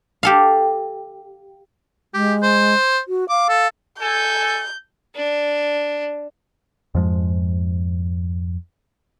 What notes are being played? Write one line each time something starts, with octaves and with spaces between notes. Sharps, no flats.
G4 A4 F5
G#3 G4
C5
F#4
F5 D6
A4
A4 G#5 G6
D4
F2 G#2 F3 G#3